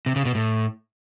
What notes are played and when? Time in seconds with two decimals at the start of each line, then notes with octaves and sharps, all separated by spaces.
0.06 C3
0.16 C#3
0.25 B2
0.35 A2